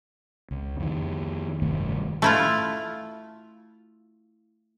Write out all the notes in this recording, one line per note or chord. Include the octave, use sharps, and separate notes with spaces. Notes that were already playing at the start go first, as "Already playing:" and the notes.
C#2
F2 D#3
F1 G2 D#3 A3
A3 E4 F4